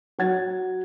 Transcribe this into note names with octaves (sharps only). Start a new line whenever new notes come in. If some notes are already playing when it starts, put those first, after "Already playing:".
F#3 C#5 F#5 G#6 A6